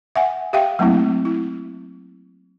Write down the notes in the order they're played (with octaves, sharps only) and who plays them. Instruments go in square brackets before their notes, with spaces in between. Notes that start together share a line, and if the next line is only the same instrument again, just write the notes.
[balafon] E5 F#5 G#5
G4 E5 F5 G5
F#3 A3 A#3 C4 E4
E4